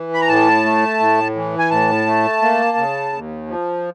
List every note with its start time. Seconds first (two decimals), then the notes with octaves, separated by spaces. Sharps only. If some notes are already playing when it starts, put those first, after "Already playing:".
Already playing: E3
0.14 B5
0.21 A#5
0.28 A2 A5
0.64 A3
1.00 A2
1.35 E3
1.59 G#5
1.71 A2 A5
2.07 A3
2.42 A#3
2.77 C#3
3.13 D#2
3.48 F3